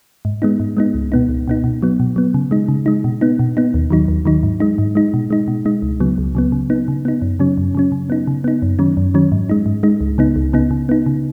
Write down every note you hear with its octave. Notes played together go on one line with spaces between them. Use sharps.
G#2
G#3 B3 D#4
G#2
G#3 B3 D#4
C#2
B2 B3 D#4
C#2
B2 B3 D#4
B2
F#3 B3
B2
F#3 B3
C#3
G#3 D#4
C#3
G#3 D#4
B2
B3 D#4
B2
B3 D#4
D#2
D#3 F#3 D#4
D#2
D#3 F#3 D#4
G#2
G#3 D#4
G#2
G#3 D#4
B2
G#3 D#4
B2
G#3 D#4
C#2
C#3 F#3 B3
C#2
C#3 F#3 B3
C#3
B3 D#4
C#3
B3 D#4
F#2
C#3 F#3 C#4
F#2
C#3 F#3 C#4
C#3
B3 D#4
C#3
B3 D#4
F#2
D#3 F#3 C#4
F#2
D#3 F#3 C#4
G#2
G#3 D#4
G#2
G#3 D#4
C#2
C#3 B3 D#4
C#2
C#3 B3 D#4
C#3
B3 D#4
C#3